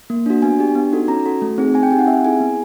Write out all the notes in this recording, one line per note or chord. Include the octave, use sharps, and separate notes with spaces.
A#3
D4 F#4
B3 G#5
D4 G4
B3
D#4 F#4 A4
C#4 A#5
F#4 A4
A3
C4 D#4 G#4
C4 G#5
G5
D#4 G4 G#5
F#5
C4 E5
E4 G#4 G#5
B3